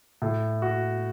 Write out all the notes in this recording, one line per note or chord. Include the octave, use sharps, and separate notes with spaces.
A2
F#4